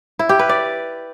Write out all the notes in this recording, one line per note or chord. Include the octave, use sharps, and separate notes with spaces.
E4
G4
B4
D5